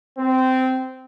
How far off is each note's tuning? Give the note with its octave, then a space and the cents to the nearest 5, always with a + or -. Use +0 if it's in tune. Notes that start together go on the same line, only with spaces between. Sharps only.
C4 -15